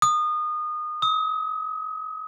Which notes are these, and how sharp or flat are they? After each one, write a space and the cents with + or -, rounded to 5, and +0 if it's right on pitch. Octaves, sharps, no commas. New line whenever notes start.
D#6 -25
D#6 +35